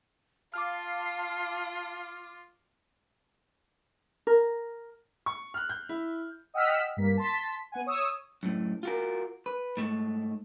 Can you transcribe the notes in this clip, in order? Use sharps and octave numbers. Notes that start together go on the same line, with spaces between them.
F4 F5 A5 D6 F6
A#4
C#6
F6 F#6
G6
E4
D#5 F#5 G5 E6 F6 B6
G2 A#3 B6
A5 C6 B6
B3 F#5 G#5
C#5 D#6 E6
F#2 A2
F4 F#4 A#4
B4
G#2 A3